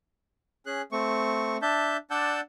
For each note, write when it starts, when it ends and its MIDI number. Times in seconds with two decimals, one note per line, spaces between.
0.66 0.82 61
0.66 0.82 68
0.66 0.82 90
0.92 1.57 57
0.92 1.57 60
0.92 1.57 85
1.62 1.97 62
1.62 1.97 76
1.62 1.97 81
1.62 1.97 91
2.11 2.41 62
2.11 2.41 74
2.11 2.41 78
2.11 2.41 81
2.11 2.41 88
2.11 2.41 91